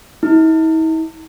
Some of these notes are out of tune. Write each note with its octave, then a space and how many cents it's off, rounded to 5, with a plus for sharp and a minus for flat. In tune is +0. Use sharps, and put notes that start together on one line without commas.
E4 -45